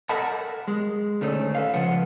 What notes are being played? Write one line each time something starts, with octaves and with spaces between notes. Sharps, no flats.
A4 A#4 E5 F#5 A5 B5
G#3
D2 D#3 A3 C#4
A4 B4 F5
C#2 C#3 F3 F#5